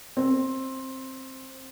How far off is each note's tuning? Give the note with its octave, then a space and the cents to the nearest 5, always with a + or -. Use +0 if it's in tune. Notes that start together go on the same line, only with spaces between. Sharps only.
C4 +15